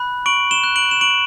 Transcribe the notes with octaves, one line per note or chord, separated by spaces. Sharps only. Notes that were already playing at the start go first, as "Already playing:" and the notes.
Already playing: B5 F#6
C#6 D7 F#7
E7 G7
F#6
D7 F#7
E7
C#6 D7 F#7